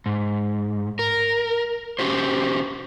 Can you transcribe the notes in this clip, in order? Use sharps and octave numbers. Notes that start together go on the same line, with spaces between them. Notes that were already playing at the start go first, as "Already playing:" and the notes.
G#2
A#4
C#4 F#4 G4 C5